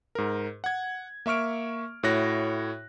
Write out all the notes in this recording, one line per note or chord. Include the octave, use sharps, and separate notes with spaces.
G#2 A#4
F#5 G#6
A#3 E5 C#6 F6 D7
A2 E4 F#4 C#5 F#6 A#6